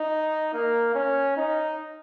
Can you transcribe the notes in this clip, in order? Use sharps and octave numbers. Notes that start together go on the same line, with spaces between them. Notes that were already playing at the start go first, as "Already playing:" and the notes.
Already playing: D#4
A#3
C#4
D#4